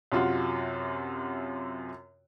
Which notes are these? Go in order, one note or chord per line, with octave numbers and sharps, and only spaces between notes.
F#2 C3 F4 F#4